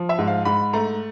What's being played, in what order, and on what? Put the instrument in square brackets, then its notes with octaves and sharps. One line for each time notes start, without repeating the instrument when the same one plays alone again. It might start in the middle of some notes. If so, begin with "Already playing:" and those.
Already playing: [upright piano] F3
E5
G#2
F5
G#2 B5
A3 A#5